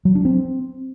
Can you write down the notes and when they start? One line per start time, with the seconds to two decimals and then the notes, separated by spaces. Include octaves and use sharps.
0.05 F#3
0.15 D4
0.25 C4